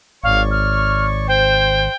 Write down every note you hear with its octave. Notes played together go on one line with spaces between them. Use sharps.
G#1 C#5 D5 F5 C#6
F6
C5 G5